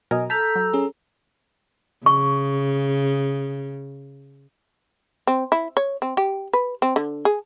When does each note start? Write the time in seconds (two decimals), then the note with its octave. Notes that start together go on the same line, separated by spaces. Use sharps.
0.11 B2 F#3 A#4 D#5 G#5
0.30 A4 A5 A#5 E6 F6 G6 B6
0.56 F#3
0.73 C#4 G#4
2.06 C#3 C#6
5.27 C4
5.52 E4
5.77 C#5
6.02 C4
6.17 G4
6.53 B4
6.82 C4
6.96 D3
7.25 G#4